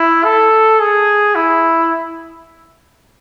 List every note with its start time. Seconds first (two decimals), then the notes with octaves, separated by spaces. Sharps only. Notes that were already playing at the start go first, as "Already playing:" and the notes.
Already playing: E4
0.25 A4
0.80 G#4
1.35 E4